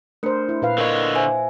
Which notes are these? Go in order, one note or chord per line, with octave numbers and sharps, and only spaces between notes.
A3 D4 A#4 C5 C#7
E4
A#2 B4 F5
D3 A#4 C#5 D#5
C5 E5 G#5